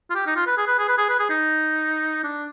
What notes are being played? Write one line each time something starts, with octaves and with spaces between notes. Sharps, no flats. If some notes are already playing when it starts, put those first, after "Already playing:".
F4
G4
D#4
F4
B4
G#4
B4
G#4
B4
G#4
B4
G#4
D#4
D4